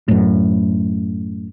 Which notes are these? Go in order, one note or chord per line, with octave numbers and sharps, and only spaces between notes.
F#2 A2